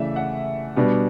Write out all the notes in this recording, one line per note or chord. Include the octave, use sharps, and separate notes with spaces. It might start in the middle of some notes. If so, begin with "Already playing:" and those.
Already playing: C#3 E3 A3 D5 E5
F#5
B2 G3 B3 D4